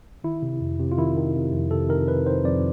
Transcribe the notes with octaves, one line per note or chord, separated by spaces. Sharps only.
D#3 E4
C3
F2
C3
F4
D#3 E4
D#3
C3
F2
C3 A4
D#3 A#4
D#3 B4
D#3 C5
F2 D5